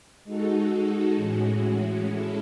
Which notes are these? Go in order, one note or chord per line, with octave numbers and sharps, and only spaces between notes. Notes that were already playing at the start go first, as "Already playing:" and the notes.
G#3 D#4 F#4 A4
A2 E3 G#3 C#4 F#4
G#3 C#4 E4 A4